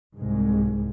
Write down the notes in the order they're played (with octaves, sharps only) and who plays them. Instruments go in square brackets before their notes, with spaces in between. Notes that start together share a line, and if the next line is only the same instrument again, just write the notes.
[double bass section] C2 G#2 G#3